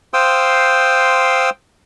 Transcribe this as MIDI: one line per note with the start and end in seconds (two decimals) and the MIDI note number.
0.14 1.50 72
0.14 1.50 77
0.14 1.50 79
0.14 1.50 84
0.14 1.50 87
0.14 1.50 88